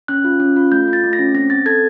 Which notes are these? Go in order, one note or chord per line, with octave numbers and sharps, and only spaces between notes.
C#4 F#6
F4
C#4
F4
A3 G6
F4
A6
A3
A#6
C#4
C4 A#6
C4 A6
A4 G#6